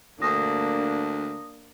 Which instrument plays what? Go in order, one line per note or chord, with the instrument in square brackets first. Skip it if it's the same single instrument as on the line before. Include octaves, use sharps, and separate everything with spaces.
[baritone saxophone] D2 [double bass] A#3 D4 [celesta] D#6 A#6